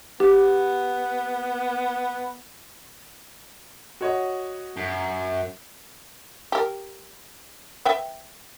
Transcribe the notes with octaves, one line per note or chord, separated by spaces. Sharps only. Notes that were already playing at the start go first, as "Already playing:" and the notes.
B3 G4
F#4 C#5 D#5
F#2
G4 A#4
B4 E5 G5